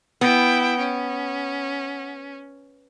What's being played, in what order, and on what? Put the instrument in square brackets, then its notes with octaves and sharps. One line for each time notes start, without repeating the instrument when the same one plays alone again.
[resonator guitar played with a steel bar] B3 [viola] E4 G5
[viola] C#4